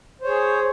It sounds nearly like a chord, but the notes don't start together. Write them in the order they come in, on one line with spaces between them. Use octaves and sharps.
C5 C#5 G#4